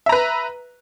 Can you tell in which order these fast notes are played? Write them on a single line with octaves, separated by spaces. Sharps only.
E5 A#5 B4